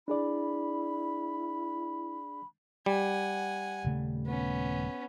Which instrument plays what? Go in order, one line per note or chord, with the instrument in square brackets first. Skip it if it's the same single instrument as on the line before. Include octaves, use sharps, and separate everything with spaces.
[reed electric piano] D4 G#4 D5 [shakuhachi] E4 [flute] B5
[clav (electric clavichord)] G3 [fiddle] F#5 G#5
[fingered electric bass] D#1 C#3 A3
[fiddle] B3 C#4